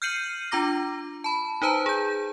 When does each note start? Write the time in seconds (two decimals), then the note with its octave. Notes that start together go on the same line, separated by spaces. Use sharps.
0.02 F6 G6 C7 C#7 D#7 F#7
0.51 D4 F4 A#5 D6 A#6
1.24 A5 B5
1.62 D#4 B4 C5 A5 A#5
1.86 G#4 G6